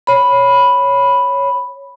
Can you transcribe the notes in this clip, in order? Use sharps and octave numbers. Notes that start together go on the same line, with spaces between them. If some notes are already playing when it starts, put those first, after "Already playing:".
C#5 B5